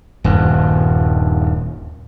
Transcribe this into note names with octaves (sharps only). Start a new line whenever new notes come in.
D#1 G2